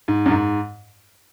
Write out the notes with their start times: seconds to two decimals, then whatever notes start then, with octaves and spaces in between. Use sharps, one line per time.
0.08 G#2
0.26 F#2
0.31 G#2